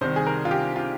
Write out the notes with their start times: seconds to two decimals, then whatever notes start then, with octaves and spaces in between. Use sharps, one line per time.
0.01 C2 C3 D#3 G3 C5
0.16 G#4
0.26 A#4
0.45 F4
0.51 G4
0.76 F4